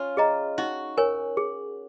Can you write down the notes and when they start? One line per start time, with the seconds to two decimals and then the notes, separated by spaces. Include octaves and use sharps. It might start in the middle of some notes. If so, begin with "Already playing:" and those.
Already playing: C#4 F4
0.17 G#4 D#5 A#5
0.58 D#4 F#4
0.97 A#4 C#5 G#5
1.37 G#4